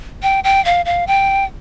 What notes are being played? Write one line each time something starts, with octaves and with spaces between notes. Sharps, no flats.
G5
G5
F5
F5
G5